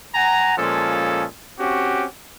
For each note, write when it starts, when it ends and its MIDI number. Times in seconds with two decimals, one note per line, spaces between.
0.15 0.58 78
0.15 0.58 80
0.15 0.58 82
0.58 1.25 46
0.58 1.25 53
0.58 1.25 56
0.58 1.25 61
0.58 1.25 69
1.59 2.06 60
1.59 2.06 61
1.59 2.06 66
1.59 2.06 67